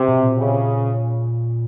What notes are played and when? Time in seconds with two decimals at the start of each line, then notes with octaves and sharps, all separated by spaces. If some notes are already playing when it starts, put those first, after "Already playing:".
Already playing: C3
0.08 B2
0.23 A#2
0.39 C#3